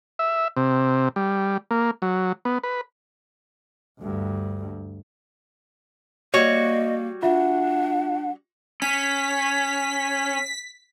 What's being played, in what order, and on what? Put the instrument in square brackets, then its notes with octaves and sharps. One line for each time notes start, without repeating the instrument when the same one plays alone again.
[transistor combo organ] E5
C3
G3
A#3
F#3
B3
B4
[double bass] D2 G2
[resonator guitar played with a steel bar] G3 F#4 C#5 [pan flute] A#3 [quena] D#5
[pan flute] D4 [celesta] F4 E5 [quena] F#5
[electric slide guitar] C#4 [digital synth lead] B6